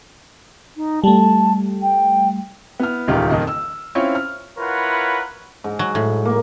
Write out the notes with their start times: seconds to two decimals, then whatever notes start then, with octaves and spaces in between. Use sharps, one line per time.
0.76 D#4
1.04 G3 A3 A5
1.82 G5
2.80 B3 E4 F6
3.08 D#1 C#2 D#3 E3 F4 G4
3.31 F2 A#2 D#3 A#3 D#4
3.47 E6
3.95 C4 C#4 E4 F4 C#5
4.15 F6
4.58 E4 F4 A#4 B4 C#5 F#5
5.64 G#2
5.79 F#3
5.95 A2
6.25 A#3